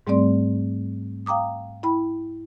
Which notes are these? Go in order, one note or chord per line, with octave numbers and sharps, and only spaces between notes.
G#2 G3 A3 C4 D5 C6
F5 G5 A#5 D6 D#6
E4 G5 B5